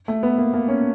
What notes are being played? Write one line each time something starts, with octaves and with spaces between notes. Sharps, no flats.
A3
B3
A#3
A#3
C#4